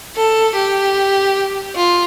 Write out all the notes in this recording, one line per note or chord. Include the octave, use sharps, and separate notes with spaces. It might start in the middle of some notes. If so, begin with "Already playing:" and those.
A4
G4
F4